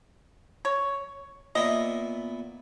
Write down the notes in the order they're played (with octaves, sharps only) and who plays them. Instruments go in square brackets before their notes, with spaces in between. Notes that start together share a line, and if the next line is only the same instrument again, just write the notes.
[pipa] C#5
[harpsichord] A#2 B3 E4 [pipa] D#5